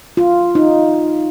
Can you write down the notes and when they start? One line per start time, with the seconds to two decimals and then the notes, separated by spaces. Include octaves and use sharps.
0.17 F4
0.55 D#4